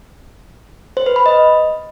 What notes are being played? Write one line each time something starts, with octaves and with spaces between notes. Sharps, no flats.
C5
B4
B5
D#5